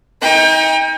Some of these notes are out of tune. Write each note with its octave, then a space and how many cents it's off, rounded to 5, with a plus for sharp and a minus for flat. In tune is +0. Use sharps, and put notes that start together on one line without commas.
D#4 +30 G5 +35